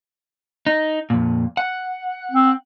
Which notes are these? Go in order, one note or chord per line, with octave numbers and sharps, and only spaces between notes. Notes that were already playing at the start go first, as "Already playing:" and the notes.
D#4
F2 A#2
F#5
C4